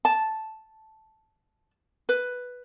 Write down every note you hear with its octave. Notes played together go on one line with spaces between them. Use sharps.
A5
B4